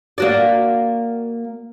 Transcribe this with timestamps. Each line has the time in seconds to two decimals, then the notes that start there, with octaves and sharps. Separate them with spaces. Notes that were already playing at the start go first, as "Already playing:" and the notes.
0.18 A#3 F#4 D5